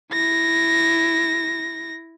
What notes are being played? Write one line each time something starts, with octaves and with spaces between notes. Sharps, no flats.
E4 A#6